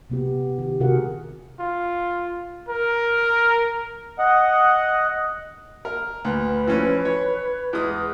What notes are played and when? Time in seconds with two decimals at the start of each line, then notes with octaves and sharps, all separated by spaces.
0.10 C3 B3 G4
0.58 D#3 G4
0.80 C3 F#4 G#4 A#4 F#5
1.60 F4
2.69 A#4
4.19 D#5 F#5
5.85 A#4
6.25 D2 B4
6.67 E3 F3 C#4
7.05 C#5
7.73 E2 G#3 D#6